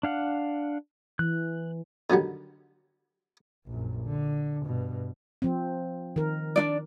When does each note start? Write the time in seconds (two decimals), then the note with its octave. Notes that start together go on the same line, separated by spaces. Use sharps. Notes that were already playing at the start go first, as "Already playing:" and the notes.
0.03 D4 F5 F#5
1.19 E3 F#6
2.10 D3 D#3 F#3 G3
3.66 A#1 F#2
4.04 D3
4.65 G2 B2
5.42 F3 C4
6.16 D#3 A#4
6.56 D4 D#4 D5